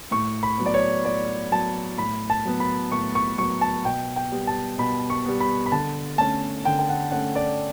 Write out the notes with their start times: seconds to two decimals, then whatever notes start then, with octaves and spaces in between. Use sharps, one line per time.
0.11 A2 C#6
0.43 B5
0.58 F#3 B3
0.66 D5
0.74 C#5
1.05 A2 D5
1.52 F#3 B3 A5
1.98 A2 B5
2.30 A5
2.45 F#3 B3
2.60 B5
2.92 A2 C#6
3.15 C#6
3.38 F#3 B3 C#6
3.61 A5
3.85 B2 G5
4.16 G5
4.32 G3 B3
4.47 A5
4.78 B2 B5
5.10 C#6
5.25 G3 B3
5.40 B5
5.66 B5
5.72 D3 A5
6.18 A3 C#4 A5
6.65 D3 G5
6.79 G5
6.89 F#5
7.11 A3 C#4 F#5
7.35 D5